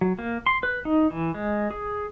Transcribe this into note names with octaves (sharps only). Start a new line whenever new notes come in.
F#3
A#3
C6
B4
D#4
E3
G#3
G#4